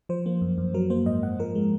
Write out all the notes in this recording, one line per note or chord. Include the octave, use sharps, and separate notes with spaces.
F3 C5
A#3
F#2
F#2
F#3 A#4
A#3 C5
G#2 D#5
G#2 F#5
F3 A#4
G#3